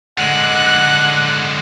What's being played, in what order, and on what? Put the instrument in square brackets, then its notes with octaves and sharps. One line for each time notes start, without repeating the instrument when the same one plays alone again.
[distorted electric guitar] D3 G#3 [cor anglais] F#5 [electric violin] F#6